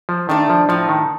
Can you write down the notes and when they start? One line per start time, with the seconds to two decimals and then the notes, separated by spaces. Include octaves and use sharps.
0.09 F3
0.29 D#3 A3 D4
0.50 F3
0.69 A2 F3
0.89 D#3